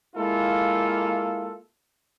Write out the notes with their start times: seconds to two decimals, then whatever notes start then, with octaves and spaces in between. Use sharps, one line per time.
0.16 G#3 A#3 E4 F4 A4